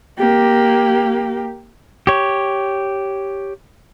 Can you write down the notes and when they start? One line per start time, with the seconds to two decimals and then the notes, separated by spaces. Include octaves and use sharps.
0.18 A#3 G4
2.07 G4 C#5